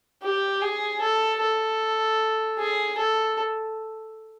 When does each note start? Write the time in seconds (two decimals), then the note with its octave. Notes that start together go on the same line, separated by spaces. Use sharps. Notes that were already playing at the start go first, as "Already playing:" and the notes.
0.23 G4
0.62 G#4
1.01 A4
1.41 A4
2.58 G#4
2.98 A4